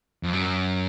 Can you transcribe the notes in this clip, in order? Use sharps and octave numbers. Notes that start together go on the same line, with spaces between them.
F2
F#2